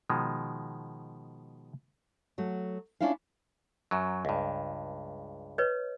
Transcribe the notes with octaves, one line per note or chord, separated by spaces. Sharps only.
B2 D#3 F3 G#3
F#3 A3 F#4
C#4 D4 E4 F4 F5
F#2 F#3
C#2 G2
B4 C#5 D#5